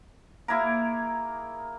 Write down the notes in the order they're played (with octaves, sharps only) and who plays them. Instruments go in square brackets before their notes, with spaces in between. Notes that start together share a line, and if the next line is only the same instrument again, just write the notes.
[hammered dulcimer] A#3 E4 G#4 A#4